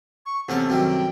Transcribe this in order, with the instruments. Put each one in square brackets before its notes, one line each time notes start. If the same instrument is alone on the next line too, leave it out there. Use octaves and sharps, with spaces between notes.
[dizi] C#6
[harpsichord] E2 C#4 A5 [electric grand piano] C3 A3 C4 [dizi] F#5
[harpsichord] F#2 D#3 G3 [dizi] G5